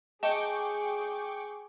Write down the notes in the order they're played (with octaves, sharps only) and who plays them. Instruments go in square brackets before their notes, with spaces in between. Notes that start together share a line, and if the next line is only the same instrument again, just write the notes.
[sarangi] G#4 [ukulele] D#5 [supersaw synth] G5 C#6 D6 [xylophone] A5